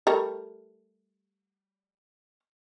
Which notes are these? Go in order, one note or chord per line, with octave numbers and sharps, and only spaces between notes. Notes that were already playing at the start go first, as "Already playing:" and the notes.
G3 A3 A#4